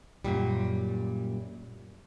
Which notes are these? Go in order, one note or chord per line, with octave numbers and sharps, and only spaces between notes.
F#2 A#2 G3